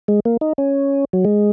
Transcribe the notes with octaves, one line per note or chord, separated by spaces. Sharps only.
G#3
A#3
D#4
C#4
F#3
G#3